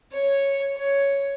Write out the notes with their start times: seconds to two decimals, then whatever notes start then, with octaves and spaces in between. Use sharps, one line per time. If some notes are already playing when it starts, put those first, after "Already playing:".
0.12 C#5
0.75 C#5